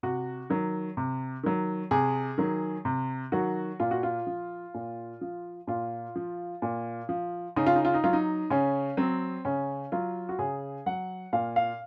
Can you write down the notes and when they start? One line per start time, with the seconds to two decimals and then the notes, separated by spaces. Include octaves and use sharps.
0.03 C3 F#4
0.50 D#3 F#3
0.97 C3
1.43 D#3 F#3
1.91 C3 G#4
2.38 D#3 F#3
2.85 C3
3.32 D#3 F#3 F#4
3.80 A#2 F4
3.91 F#4
4.03 F4
4.27 F3
4.74 A#2
5.21 F3
5.67 A#2 F4
6.16 F3
6.62 A#2
7.09 F3
7.56 C#3 D#4
7.66 F4
7.76 D#4
7.85 F4
7.94 D#4
8.04 F#3 F4
8.13 D#4
8.50 C#3 C#4
8.97 F#3 C4
9.45 C#3 C#4
9.92 F#3 F4
10.29 F#4
10.39 C#3 G#4
10.86 F#3 F#5
11.33 A#2 F5
11.56 F5